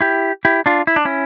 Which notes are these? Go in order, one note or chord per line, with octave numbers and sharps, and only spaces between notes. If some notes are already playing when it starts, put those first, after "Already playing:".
E4 G4
E4 G4
D4 F4
E4
D4
C#4 E4